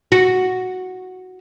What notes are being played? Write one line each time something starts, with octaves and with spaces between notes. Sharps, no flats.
F#4